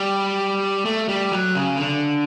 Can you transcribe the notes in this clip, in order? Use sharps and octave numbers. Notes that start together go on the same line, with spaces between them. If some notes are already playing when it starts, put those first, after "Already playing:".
Already playing: G3
A3
G3
F#3
C#3
D3